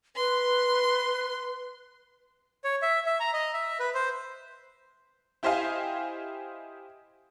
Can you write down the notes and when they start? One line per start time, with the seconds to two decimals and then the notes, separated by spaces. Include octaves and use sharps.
0.16 B4 C6
2.64 C#5
2.82 E5
3.06 E5
3.20 A#5
3.33 D#5
3.54 E5
3.80 B4
3.94 C5
5.43 E4 G4 C5 D#5 F5 G#5